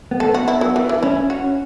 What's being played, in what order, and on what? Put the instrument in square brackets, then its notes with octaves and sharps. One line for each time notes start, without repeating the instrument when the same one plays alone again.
[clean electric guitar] B3
[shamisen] A4
[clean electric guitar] B3
[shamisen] F#4
E4
F#3
E3
E3
[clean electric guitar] C#4 [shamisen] E4
[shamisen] F#4